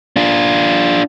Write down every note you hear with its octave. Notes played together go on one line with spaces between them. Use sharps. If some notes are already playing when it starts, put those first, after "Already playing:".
D4 F4